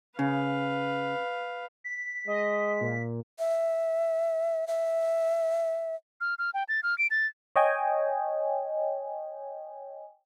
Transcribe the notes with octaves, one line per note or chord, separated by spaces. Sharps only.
C#3 B4 F5
B6
G#3 D#5
A#2
E5
E5
F6
F6
G5
A6
F6
D7
A6
C#5 D#5 G5 G#5